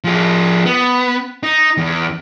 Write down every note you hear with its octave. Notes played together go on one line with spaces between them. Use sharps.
F3 G#4
B3
D#4
E2